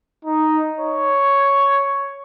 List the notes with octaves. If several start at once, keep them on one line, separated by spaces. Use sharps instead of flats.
D#4
C#5